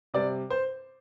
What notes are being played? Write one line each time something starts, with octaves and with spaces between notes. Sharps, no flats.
C3 G3 D5
C5